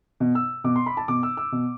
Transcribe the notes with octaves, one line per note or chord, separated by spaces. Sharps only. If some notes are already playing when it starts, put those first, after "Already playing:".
B2
E6
B2 D6
C6
B5
A5
B2 D6
E6
E6
B2